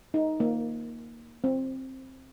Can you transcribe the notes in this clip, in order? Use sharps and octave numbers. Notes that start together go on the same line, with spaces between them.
D#4
A#3
C4